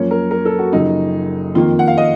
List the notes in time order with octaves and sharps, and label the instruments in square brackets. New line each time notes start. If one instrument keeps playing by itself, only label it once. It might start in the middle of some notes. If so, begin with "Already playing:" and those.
Already playing: [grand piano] F#2 F3 A#3 C#4 C#5
A#4
A#4
A4
F#4
F#1 F#2 F3 D#4
F2 D#3 A#3 F4
F#5
F5
D#5